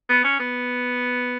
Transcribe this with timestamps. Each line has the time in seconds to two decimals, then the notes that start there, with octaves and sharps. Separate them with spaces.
0.09 B3
0.24 C#4
0.40 B3